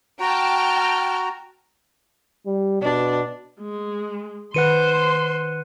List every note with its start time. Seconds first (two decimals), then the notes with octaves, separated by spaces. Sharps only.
0.20 F#4 G5 A5 A#5 F6
2.46 G3
2.82 B2 D4
3.61 G#3
4.54 D#3 B4 C5 F#5 C6 F#6 C#7 D#7